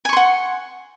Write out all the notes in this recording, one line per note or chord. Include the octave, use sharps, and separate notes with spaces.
F#5 G#5 C6 C#6